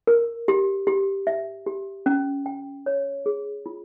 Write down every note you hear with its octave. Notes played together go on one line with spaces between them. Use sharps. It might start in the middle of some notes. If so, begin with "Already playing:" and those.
A#4
G4
G4
E5
G4
C#4
G5
C#5
G#4
F4